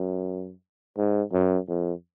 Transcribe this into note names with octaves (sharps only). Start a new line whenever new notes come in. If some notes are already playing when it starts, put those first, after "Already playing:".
Already playing: F#2
G#2
F#2
F2